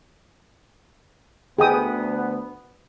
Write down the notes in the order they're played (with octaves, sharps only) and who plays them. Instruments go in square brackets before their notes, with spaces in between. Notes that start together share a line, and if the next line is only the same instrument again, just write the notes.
[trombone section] D2 B3 [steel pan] G#4 G5 D#6